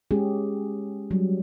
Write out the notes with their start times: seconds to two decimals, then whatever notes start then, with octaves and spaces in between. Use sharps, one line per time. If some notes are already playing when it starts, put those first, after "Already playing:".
0.11 G#3 C#4 G4 G#4
1.11 F#3 G3